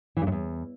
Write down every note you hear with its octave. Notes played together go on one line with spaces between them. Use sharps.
E3
G2
F#2
E2